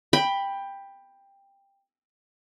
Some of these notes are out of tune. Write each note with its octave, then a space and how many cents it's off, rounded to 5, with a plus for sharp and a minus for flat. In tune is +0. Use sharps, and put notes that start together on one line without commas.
G5 +15 B5 +0